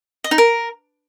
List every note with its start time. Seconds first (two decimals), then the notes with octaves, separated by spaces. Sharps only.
0.24 D#5
0.31 D#4
0.38 A#4